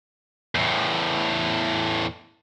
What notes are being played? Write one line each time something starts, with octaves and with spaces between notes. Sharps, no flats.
E2 A2